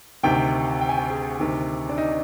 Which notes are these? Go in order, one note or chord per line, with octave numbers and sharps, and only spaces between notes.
D2 C3 D#3 G5
G5
G#5
G5
G#4
D2 C3 D#3
D4
D#4